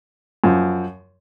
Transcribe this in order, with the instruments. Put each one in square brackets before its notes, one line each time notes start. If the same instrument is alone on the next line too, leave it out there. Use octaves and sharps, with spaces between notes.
[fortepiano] F#2 F3